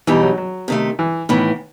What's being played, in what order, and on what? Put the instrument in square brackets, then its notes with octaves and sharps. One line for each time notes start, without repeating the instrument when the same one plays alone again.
[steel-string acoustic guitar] E2 B2 G3 D#4 [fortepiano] E3
[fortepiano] F#3
F#3
[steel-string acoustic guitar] C3 D#3 A3
[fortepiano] E3
[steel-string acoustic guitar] A2 E3 B3 [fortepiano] D#3